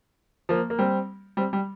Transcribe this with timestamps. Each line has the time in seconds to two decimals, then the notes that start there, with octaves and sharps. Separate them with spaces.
0.49 F3 A#3
0.70 A#3
0.79 G3 C4
1.37 G3 C4
1.53 G3